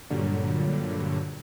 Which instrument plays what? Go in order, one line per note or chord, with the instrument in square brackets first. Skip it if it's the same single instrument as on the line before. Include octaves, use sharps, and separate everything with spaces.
[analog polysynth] G2 A#2 D3 F#3 G3